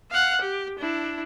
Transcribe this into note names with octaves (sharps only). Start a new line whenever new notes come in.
F5 F#5
G4
D4 E4